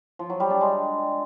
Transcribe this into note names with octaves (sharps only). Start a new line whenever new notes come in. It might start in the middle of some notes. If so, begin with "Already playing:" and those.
F3
F#3
G3
D4
G#3